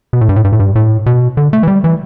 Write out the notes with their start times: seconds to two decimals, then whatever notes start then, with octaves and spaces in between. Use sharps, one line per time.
0.13 B2
0.21 A2
0.29 G2
0.36 A2
0.44 G2
0.52 A2
0.60 G2
0.75 A2
1.06 B2
1.37 D3
1.53 A3
1.63 E3
1.68 G3
1.84 E3